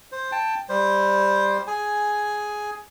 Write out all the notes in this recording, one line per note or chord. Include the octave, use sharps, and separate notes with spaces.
C5
G5 A5
G3 C5
G#4 G#5